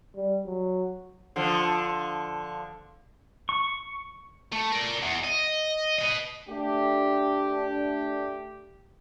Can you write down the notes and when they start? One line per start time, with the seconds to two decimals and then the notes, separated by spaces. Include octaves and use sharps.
0.16 G3
0.46 F#3
1.36 D3 F3
3.49 C#6
4.53 A3
4.72 A#4 D5
5.03 E2
5.24 D#5
5.99 B4 D#5
6.49 A3 D4 G4